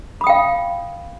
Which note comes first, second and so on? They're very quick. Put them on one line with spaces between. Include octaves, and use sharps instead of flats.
B5 D#6 G5 F5